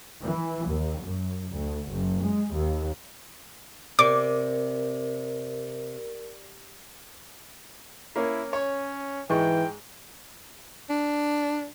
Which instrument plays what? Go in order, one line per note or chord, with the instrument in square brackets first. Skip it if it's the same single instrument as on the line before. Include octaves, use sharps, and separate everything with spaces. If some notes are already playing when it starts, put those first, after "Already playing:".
[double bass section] E3
D#2
F#2
D2
F#1
G#3
D#2
[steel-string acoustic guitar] C3 [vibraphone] A#4 [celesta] D5 [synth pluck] D6
[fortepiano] A#3 C#4 [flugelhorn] E4
[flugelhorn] C#4 [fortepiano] C#5
[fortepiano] G#2 G#3 C#6 [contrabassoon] E3 [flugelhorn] G5
[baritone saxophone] D4